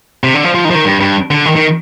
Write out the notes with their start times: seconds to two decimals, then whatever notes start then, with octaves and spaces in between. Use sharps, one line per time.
0.24 C3
0.34 D3
0.44 F3
0.54 F3
0.65 D#3
0.70 F3
0.75 D#3
0.85 G2
1.00 G2
1.31 D3
1.45 D#3
1.56 D#3